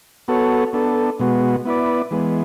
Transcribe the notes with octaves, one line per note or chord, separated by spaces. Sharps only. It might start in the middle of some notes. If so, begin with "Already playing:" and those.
B3 F#4 A4 C#5
B3 D4 A4
B2 G#3 B3 F#4
B3 E4 B4 D5
E3 G#3 B3